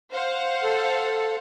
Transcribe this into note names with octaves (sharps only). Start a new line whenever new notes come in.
C5 F5 F#5
A4